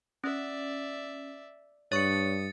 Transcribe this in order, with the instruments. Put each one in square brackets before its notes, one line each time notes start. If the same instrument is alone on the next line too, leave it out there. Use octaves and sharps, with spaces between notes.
[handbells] C#4 [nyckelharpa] D5 E5
[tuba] G2 [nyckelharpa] D4 D#6 [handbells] C#5 C#6 [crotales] A6 C#7